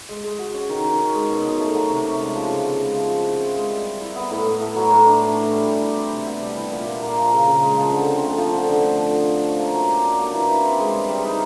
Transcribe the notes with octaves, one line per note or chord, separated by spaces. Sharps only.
G#3
G#3
F#4
C#4
D#3
D#3
C#4
G#3
B2
B2
A3
F#3
C3
C#4
G#3
F3
C#3
B3
G#3
F3
F3
E4
C4
G#3
G3
G3
E4
B3
A2
A2
A3
F#3
A2
D4
A3
E3
G3
G4
E4
C4
C3
B3
G3
E3
A#2
A#2
A#3
F3
C#3
C#3
G#3
F3
D3
C4
A3
F3
D3
D3
A3
F3
F3
F3
C#4
A#3
F#3
G4
D4
A#3
E3
E3
C4
G#3
G3
G3
D#4